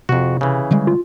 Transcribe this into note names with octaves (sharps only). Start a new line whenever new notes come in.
F2 C3 F#4
C#3 E3
D3 G3 G#3
F4